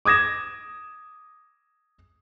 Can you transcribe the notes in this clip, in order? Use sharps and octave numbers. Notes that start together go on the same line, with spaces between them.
D6 D#6 G#6 A#6 E7